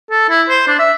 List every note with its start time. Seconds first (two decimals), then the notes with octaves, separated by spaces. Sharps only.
0.10 A4
0.29 E4
0.49 C5
0.67 D4
0.79 E5